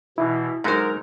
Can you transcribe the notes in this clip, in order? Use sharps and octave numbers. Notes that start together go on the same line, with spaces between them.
B2 E3 E4
D3 F#3 G#3 D#4 A#4 C5 A#5